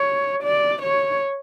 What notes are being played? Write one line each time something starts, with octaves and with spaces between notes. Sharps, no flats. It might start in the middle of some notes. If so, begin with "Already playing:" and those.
Already playing: C#5
D5
C#5